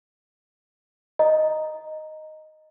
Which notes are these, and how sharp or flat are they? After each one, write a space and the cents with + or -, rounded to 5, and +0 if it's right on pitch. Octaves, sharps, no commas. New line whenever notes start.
D#5 +0 A#5 +0